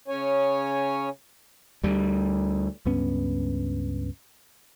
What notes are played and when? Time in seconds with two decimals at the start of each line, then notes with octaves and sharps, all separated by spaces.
0.08 C#3 C#4 C#5 G#5
1.83 D2 G3
2.86 C#2 G2 B3 C#4